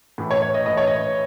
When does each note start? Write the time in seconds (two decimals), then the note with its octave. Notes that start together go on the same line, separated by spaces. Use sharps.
0.18 A2 E3
0.31 C#5
0.42 C#5
0.54 D#5
0.66 A2 E3 D#5
0.77 C#5
0.87 D#5